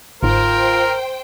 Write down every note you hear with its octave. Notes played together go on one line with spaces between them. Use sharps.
G1 G#2 F4 A#4 C5 G5